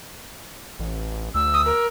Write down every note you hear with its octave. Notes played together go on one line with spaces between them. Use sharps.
A1
D2 E6
D#6
A#4